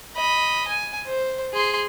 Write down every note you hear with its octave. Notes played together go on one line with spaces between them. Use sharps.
D#5 B5
G#5
C5
G#4 C6